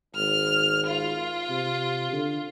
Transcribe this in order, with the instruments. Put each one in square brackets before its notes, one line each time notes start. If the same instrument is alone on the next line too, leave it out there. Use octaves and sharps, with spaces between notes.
[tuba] G#1 [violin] F6
[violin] F4
[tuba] C3
D3